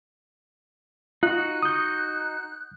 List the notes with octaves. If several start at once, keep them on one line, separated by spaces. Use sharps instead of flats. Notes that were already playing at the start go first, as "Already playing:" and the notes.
D#4 F4 F#4 F#6
D#6 G6